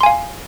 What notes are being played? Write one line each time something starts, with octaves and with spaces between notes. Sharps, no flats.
F5 G#5 C6